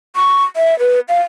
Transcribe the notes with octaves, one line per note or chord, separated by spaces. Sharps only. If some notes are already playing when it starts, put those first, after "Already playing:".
C#6
E5
B4
F5